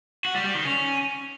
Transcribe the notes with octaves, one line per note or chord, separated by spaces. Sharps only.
F#4
G3
G3
D#3
C#4